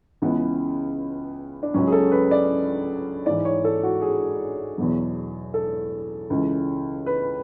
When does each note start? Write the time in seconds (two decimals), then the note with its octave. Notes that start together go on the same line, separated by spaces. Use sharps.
0.22 C#2 C#3 E3 B3
1.63 D4
1.74 C#2 C#3 F#3 C#4
1.87 G#4
1.92 A4
2.12 B4
2.31 D5
3.26 G#2 E3 D5
3.45 C#5
3.65 A4
3.83 F#4
4.02 G#4
4.78 E2 B2 F#3
5.54 A4
6.30 C#2 C#3 E3
7.06 B4